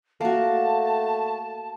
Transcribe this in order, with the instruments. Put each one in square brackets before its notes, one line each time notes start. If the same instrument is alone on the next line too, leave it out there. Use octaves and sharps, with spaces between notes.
[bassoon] A3 [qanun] A#3 F#4 [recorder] A5